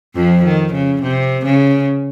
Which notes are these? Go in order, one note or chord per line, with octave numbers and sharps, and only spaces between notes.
F2 F3
D#3
C#3
C3
C#3